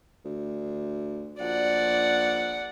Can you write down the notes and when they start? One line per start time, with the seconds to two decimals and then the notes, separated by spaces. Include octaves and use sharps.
0.25 D2
1.40 A#1 D5 F#5